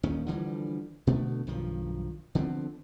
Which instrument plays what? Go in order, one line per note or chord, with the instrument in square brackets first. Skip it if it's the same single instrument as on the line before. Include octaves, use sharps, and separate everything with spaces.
[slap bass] D#1 D#2 D#3 C#4
D3 E3 F3 G3
B2 D3 A3 B3
B1 G2 D#3 F3
D3 F3 B3 C4